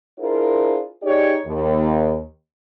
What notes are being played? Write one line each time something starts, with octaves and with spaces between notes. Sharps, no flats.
D4 E4 F4 G#4 A#4 C5
D#4 G4 G#4 C#5 D5
D#2